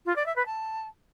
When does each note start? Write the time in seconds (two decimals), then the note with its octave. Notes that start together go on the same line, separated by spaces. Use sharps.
0.06 F4
0.16 D5
0.26 E5
0.36 B4
0.46 A5